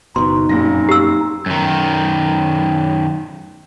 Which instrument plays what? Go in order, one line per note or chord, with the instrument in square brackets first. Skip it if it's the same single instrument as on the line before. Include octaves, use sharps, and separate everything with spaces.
[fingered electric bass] F#1 B2 [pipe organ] D#4 [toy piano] C6
[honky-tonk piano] F1 A#2 A#6 [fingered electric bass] F#2
[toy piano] G4 E6
[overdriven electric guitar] F#2 D#3